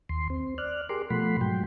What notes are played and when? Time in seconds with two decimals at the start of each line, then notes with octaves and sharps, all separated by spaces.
0.09 D#2 C6
0.30 C4
0.58 D5 F6 F#6
0.89 G4 G#4 A#4 C6 D6
1.10 B2 F3 A3 F#5 B5 C6
1.41 G#2 F#3 G5